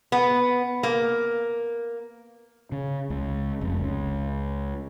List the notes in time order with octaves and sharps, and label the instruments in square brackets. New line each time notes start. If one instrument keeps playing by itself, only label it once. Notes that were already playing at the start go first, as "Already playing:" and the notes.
[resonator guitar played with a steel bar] B3
A#3
[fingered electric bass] C#3
C#2
F1
C#2